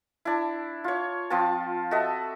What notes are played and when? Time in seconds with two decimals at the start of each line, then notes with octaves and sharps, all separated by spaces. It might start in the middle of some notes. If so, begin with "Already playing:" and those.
0.25 D4 E4
0.84 F4 C#5
1.30 F3 C4 F4 A5
1.91 F#4 A4 D#5 E5